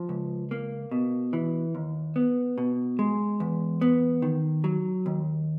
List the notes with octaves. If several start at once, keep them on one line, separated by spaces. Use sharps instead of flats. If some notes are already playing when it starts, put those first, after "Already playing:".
Already playing: F3
C#2
A#3
B2
E3
D#2
B3
B2
G#3
E2
B3
D#3
F#3
D#2